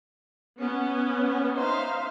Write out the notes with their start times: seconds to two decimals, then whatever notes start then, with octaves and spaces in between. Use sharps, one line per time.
0.59 B3 C#4
1.59 D#4 C5 E5 F5